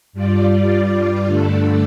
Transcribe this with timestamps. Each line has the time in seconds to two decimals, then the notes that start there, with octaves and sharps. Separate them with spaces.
0.13 G2 G3 F4 D5
1.26 G2 D3 A3 D4 A4